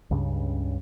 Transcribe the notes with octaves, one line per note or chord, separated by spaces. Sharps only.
C#2 G2 C#3